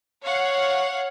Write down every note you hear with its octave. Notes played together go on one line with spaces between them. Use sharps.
C#5 F5 F#5